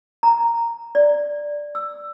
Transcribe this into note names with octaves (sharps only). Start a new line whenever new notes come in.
A#5
D5
E6